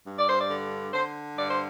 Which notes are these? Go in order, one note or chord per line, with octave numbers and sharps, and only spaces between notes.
G2
D5
C5
D5
D3
D3 C5
G2 D5
C5